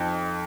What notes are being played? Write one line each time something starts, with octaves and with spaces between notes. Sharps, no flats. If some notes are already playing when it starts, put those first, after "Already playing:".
Already playing: F2 F3 D#4